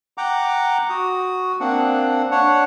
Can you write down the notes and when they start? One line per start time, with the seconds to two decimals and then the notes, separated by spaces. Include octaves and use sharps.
0.18 F#5 G5 A#5 D6
0.90 F#4 D#6
1.60 A#3 C4 D4 F#5
2.31 D4 C#5 F#5